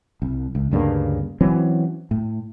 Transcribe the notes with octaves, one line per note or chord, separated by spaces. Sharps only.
C2
C#2
D2 G2 C#3 A#3
E3 F#3 C4 C#4
A2